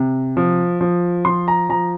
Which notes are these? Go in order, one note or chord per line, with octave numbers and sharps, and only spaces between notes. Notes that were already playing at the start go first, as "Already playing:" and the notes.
Already playing: C3
F3
F3
F3 C6
A#5
F3 A#5